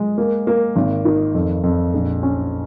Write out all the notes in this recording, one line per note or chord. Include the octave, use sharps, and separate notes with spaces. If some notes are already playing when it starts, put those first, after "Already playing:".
Already playing: G#3
A#3
A#3
G#1
D#3
F2
F2
A#1
C#4